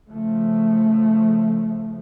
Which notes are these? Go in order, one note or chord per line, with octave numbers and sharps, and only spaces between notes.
C#3 F3 A3